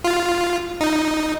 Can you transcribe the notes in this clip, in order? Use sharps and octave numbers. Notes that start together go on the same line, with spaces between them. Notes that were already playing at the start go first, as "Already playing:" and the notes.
F4
D#4